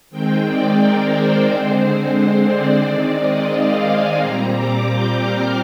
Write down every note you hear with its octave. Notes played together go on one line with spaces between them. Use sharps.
D#3 G#3 C4 G5
D5
A#4
C5
D3 G#3 C4 C5
D5
D#3 G#3 C4 D5
D#5
F5
G#5
A#2 G3 C4 A#5
D6
G6
F6